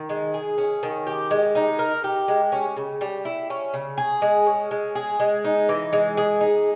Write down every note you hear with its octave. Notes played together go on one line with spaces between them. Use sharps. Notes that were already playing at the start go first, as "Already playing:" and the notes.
Already playing: D#3
G#3
G#4
C#4
D#3
G4
G#3
D#4
A#4
G4
G#3
C#4
C#3
G3
E4
C#4
C#3
G#4
G#3
C#4
G#3
G#4
G#3
D#4
E3
G#3
G#4
D#4